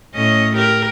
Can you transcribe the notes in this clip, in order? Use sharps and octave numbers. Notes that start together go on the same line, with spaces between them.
A2 C#4 D#5
G4 A#4